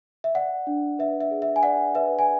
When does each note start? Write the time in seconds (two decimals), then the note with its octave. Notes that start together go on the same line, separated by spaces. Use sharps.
0.24 E5
0.35 D5 F#5
0.67 D4
0.99 B4 E5
1.21 E5
1.31 G#4
1.42 E5
1.56 G#5
1.63 D5 F#5
1.95 B4 E5
2.19 G#5